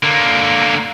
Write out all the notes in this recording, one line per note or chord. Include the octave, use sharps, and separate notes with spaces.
D3 A#3